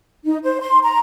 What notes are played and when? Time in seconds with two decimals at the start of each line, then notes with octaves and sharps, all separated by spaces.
0.25 D#4
0.44 C5
0.60 C6
0.83 A#5